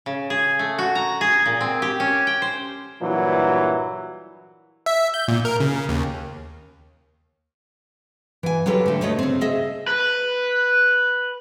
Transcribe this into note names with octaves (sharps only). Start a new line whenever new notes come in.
C#3
G#4
A3
F#4
A#5
G#4
A#2
C4
G4
C#4
G5
C5
G2 A#2 E3 F#3
E5
G6
A#2
A#4
C#3
D#2
E3 G#5
F#3 F4 G4 A4 B4
D3 A3
D2 A3 C#5 D#5
C#3 C4
G#4 D#5 E5
B4